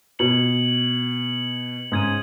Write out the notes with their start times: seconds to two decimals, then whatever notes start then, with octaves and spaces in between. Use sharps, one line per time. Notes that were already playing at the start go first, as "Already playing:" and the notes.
0.19 B2 G#6 C#7 F#7
1.92 G#2 C#3 D#6 G#6 D#7